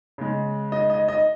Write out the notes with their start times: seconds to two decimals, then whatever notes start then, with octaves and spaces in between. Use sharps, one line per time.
0.18 C#3 G#3
0.72 D#5
0.90 D#5
1.08 D#5